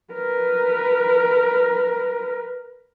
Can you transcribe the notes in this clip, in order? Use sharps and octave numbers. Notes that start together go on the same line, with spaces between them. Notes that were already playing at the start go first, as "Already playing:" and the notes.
A#4 B4